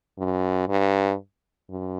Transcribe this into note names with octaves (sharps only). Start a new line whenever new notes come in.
F#2
G2
F#2